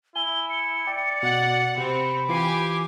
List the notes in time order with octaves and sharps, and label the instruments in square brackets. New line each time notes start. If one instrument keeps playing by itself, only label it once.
[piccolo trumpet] E4 [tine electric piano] G#5 [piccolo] G7
[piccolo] C#7
[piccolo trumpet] D5 [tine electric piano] G5
[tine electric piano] B2 [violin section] F#5
[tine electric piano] C3 [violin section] C4 [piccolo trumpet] B5
[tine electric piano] E3 F4 C7 [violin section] G4 G#5 D6